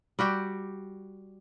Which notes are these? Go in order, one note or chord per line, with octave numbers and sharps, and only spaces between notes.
G3 F#4 G4